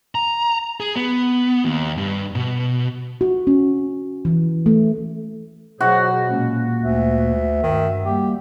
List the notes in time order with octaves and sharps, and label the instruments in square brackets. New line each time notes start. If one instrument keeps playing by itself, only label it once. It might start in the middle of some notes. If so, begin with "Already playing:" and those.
[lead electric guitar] A#5
G#4
B3
D#2
G2
B2
[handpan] F#4
C#4
E3
A3
[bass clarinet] B2 [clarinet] F#3 [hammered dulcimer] F#4 [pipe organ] G#4 C5
[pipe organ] A#2 G#3 A#3 [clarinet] C#4
[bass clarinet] D2 [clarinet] E5
[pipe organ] G2 [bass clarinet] D#3
[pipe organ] G3 A#3 [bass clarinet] G4